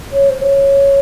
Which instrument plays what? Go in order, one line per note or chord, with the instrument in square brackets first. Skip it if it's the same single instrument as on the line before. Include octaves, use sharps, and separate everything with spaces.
[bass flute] C#5
C5
C#5